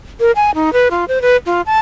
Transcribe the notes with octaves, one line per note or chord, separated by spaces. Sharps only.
A#4
G#5
D#4
B4
F4
C5
B4
F4
A5